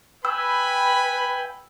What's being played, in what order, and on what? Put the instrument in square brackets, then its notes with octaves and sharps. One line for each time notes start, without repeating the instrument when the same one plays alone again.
[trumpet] B4 [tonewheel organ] G5 [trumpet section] G#5 B5 [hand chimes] E6